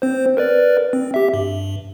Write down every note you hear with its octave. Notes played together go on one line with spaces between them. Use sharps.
C4 C5
A#4 B4 D5
C4
G4 E5
G2